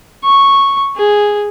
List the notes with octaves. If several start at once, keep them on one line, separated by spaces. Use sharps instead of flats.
C#6
G#4